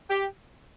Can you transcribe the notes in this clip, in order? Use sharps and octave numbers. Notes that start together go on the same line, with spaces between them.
G4